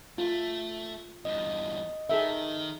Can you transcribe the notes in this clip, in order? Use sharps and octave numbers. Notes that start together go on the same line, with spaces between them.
A3 F4
E2 G2 D#5
D#3 G#4 A4 E5